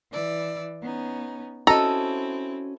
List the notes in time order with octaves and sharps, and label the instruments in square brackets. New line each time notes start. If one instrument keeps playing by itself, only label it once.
[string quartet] E3 D5 E6
B3 C#4 D#4
[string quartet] C4 E4 [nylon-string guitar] C#4 F#4 D#5 [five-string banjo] A4 [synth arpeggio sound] A#5